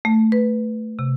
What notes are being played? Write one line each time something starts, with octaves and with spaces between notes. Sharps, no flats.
A3
B4
C3